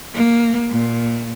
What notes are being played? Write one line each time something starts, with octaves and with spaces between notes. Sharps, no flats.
A#3
A#2